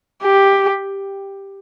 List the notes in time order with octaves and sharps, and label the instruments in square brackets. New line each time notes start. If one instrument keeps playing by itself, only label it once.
[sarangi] G4